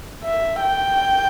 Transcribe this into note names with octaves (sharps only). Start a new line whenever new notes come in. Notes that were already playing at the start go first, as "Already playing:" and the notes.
E5
G5